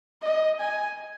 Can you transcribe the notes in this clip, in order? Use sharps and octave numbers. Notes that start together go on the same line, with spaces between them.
D#5
G#5